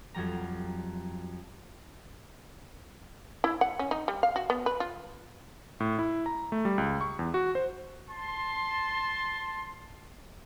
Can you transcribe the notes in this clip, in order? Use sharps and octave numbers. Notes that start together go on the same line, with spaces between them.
F2 F#3 G3 A#5
E4
F#5
C#4
D#4
G3
F5
F#4
B3
B4
F4
A2
E4
A#5
A3
G3
C#2
C#6
E2
F#4
C5
A5 C6